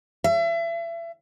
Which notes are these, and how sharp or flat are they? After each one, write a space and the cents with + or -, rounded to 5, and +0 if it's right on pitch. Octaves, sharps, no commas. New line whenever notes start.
E5 +35